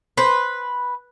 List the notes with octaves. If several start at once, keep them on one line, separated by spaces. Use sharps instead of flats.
B4 C5